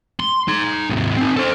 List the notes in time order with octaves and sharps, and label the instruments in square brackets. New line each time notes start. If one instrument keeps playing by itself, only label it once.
[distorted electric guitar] C6
D#4 C6
D#2 G#2
C4 D#4
A4 C5